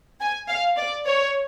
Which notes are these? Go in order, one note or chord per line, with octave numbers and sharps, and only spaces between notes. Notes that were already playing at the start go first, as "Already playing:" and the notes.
G#5
F5
D5
C#5